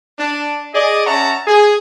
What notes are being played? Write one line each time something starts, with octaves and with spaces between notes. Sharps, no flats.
D4
G#4 D5 D#5
C#4 C#5 E5 F#5 A5 A#5
G#4